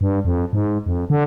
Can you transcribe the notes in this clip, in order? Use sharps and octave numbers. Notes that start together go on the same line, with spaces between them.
G2
F2
G#2
F2
D3